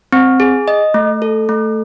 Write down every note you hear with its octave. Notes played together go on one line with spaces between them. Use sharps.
C4
G#4
D#5
A3
A4
A3